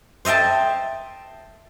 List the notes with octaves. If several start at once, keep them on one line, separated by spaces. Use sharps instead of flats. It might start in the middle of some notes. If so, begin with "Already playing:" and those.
C5 D#5 E5 G5 A5